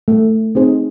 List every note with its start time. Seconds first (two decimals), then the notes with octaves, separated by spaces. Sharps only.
0.08 A3
0.55 C4 D#4 G#4 C5